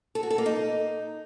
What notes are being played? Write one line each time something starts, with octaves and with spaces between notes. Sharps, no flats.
A4
F#4
A4
A#3
D#4